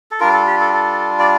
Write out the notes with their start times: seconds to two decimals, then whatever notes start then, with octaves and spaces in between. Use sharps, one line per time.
0.11 A4
0.20 G3 D4 F4 A#4
0.33 A4
0.47 G4
0.60 A4
0.73 A4
1.19 D5